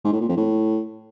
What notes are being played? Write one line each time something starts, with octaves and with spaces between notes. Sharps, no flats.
G#2
A2
A#2
F2
A2